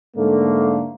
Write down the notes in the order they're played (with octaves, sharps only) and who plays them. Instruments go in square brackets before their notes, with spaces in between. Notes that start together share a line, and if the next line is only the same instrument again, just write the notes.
[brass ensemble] G#2 D3 A3 A#3